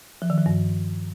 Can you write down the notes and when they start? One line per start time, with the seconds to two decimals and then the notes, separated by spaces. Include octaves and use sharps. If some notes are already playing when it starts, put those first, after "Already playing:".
0.22 F3
0.30 D#3
0.38 F3
0.46 G2